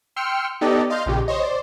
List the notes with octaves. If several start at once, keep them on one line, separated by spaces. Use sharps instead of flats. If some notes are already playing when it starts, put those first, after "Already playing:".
G5 C6 E6 F6 C#7
B3 D#4 G4 A4 D5 D#5
D#5 F5 C6 F6 G6
A#1 A#2 C#3 G4
C5 C#5 D#5
C5 D5